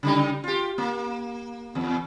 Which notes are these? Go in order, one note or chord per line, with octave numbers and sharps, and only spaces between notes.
C#3 G3 D#4
F4 G4
A#3
E2